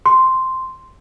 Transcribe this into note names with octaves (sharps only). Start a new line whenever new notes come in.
C6